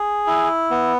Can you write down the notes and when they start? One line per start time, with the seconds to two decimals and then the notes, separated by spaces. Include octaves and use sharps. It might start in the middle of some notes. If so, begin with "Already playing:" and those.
Already playing: G#4
0.27 E4
0.71 B3